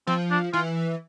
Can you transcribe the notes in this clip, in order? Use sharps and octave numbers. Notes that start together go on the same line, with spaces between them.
F3 C4
D4
E3 F4